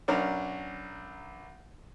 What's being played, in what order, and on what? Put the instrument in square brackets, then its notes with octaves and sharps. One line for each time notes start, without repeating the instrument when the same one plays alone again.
[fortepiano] B1 C#4 D4 A#4